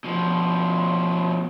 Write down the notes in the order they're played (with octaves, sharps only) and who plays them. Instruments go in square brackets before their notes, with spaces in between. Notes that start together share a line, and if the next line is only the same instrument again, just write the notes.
[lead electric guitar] B2 F3